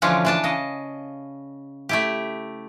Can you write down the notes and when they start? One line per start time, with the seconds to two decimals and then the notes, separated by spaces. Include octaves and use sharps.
0.02 D3 E3 F3 G#3 C#4 D4
0.25 E3 D4 A5
0.44 C#3 D#5
1.89 A3 E4 G4